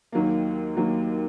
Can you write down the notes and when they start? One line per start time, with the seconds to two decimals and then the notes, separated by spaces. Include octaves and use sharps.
0.12 D#2 D#3 F#3 A#3
0.77 D#2 D#3 F#3 A#3